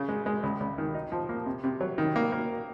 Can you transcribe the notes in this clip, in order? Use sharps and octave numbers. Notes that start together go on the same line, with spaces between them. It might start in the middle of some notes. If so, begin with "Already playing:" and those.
Already playing: C#3
G#3
G#3
C#2
C#2
D#3
D#4
F3
A#3
C3
C3
F#3
D#3
A#3
A#3